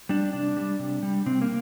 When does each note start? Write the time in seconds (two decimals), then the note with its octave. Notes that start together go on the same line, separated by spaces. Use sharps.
0.09 G3 D4
0.33 C3 D4
0.57 G3
0.79 C3
1.03 G3
1.26 C3 C4
1.42 A#3